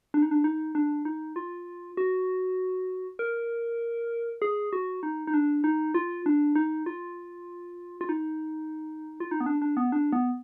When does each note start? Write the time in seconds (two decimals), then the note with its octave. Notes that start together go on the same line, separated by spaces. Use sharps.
0.14 D4
0.22 D#4
0.31 D4
0.44 D#4
0.75 D4
1.05 D#4
1.36 F4
1.97 F#4
3.19 A#4
4.42 G#4
4.73 F#4
5.03 D#4
5.27 D#4
5.34 D4
5.64 D#4
5.94 F4
6.26 D4
6.55 D#4
6.86 F4
8.01 F4
8.09 D#4
9.20 F4
9.31 D#4
9.40 B3
9.46 D4
9.62 D4
9.77 B3
9.92 D4
10.12 B3